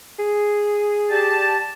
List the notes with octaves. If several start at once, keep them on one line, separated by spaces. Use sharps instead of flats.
G#4
G4 D5 A5